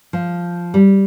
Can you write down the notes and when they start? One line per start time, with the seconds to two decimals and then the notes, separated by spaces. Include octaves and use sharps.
0.13 F3
0.74 G3